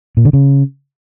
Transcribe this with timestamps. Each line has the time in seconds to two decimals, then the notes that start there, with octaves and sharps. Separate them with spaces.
0.17 A#2
0.25 D3
0.33 C#3